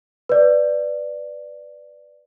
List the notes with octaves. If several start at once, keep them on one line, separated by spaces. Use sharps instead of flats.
B4 D5